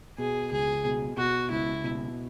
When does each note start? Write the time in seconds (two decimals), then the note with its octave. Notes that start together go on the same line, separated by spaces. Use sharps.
0.18 B2 G#4
0.51 C#2 G#4
0.85 B2
1.17 B2 F#4
1.50 C#2 E4
1.83 B2